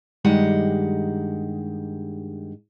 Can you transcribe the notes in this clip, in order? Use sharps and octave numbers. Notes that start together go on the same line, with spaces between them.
G2 D#3 G#3 G4 D#5 F#5